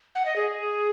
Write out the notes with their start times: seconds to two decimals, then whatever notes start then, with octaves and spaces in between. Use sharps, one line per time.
0.15 F#5
0.25 D#5
0.36 G#4